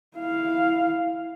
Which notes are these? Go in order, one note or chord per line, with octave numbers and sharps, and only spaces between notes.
E4 F5